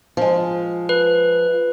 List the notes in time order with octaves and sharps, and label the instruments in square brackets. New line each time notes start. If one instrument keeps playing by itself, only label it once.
[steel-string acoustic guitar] F3 G#3
[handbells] B4